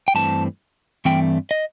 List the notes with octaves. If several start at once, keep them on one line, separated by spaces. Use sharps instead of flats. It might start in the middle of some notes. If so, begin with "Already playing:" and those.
G5
G2 E3 A3 C4 A5
G2 E3 A3 C4 G5
D#5